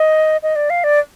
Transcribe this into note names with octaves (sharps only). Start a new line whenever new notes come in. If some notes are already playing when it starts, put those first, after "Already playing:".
Already playing: D#5
D#5
D5
F5
D5